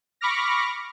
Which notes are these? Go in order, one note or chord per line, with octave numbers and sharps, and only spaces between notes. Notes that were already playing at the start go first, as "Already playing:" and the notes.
B5 C#6 D6 F6 A#6